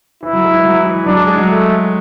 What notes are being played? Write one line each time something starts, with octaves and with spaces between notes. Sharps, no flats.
E3 E4
F#3
G#3
E3
F#3
E3
F#3 D4
G#3
G#3
F#3
A3